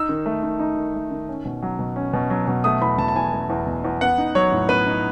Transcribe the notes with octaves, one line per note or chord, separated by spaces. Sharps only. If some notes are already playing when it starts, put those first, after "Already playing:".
Already playing: D#4 E6
D#3
A3
D#3
D#4
D#3
A3
D#3
C#4
B2
F#3
B2
C#4
B2
F#3
B2
A3 D#6
E2 B5
B2 A5
A5
E2 G#5
A3
E2
B2
E2
B3 F#5
D#4
F#3 C#5
A2
B3 B4
D#4